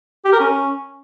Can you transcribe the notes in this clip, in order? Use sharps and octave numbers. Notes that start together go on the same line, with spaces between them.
G4
A#4
C#4